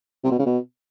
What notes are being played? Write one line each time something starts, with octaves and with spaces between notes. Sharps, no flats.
C3
B2
C#3
B2